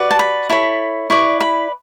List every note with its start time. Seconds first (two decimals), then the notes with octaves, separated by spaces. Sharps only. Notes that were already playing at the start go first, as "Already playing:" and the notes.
Already playing: F#4 B4 D5
0.11 A5
0.19 B5
0.49 E4 A4 C#5 B5
1.10 E4 B4 D5 C#6
1.40 B5